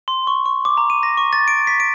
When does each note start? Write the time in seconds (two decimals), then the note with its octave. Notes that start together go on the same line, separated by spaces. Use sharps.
0.08 C6
0.27 C#6
0.46 C#6
0.65 D6
0.77 A#5
0.90 D#7
1.03 A#6
1.17 C#6
1.33 A6
1.48 D7
1.67 B6
1.80 D7